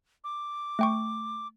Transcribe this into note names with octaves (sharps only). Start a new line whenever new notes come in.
D6
A3 G5 C#6